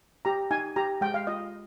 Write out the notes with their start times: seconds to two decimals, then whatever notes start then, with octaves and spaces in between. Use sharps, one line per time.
0.25 G4 A#5
0.51 D#4 G#5
0.76 G4 A#5
1.01 G#3 G5
1.14 F5
1.27 F4 D#5